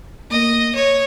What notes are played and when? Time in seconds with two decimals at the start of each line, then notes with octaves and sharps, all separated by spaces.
0.31 A#3 D#5
0.75 C#5